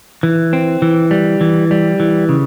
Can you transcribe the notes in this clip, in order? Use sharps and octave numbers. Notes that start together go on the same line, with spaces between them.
E3
C4
E3
G3
E3
G3
E3
C#3